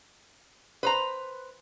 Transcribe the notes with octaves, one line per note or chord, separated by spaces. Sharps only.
B4 C5 A#5